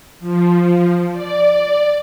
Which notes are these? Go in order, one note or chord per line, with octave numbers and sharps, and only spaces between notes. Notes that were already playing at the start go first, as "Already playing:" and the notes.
F3
D5